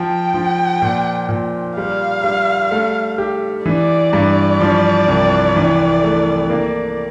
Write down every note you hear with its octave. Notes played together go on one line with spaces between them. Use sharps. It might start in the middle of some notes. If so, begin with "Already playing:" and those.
Already playing: F3 G5
F3
A#2
A#2
G3 F5
G3
A3
G4
E3 D5
G2
F3
C2
E3
A3
A#3